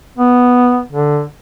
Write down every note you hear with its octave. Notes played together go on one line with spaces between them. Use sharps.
B3
D3